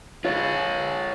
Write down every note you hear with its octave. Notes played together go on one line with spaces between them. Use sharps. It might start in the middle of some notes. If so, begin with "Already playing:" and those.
F4 C#5